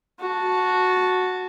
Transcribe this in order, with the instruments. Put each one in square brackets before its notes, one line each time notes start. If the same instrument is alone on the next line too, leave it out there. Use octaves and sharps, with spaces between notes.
[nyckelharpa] F#4 A5